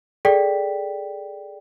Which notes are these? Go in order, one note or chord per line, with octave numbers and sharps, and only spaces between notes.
G#4 A4 D5 G5 B6